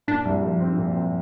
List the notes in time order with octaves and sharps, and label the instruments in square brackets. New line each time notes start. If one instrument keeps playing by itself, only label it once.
[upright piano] A#2 [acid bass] D4
[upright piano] C2
F3
C4
A#2
C4